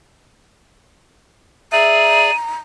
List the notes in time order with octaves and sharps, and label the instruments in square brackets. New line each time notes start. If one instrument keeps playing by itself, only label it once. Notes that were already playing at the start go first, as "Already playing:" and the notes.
[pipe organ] G#4 D5 [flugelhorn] E5 [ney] A#5 [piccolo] D#7